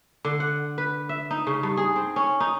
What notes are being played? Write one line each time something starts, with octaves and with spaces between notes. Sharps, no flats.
D3
F#5
B4
E5
D#4
C#3
G2
G#4
C4
C#4
D#4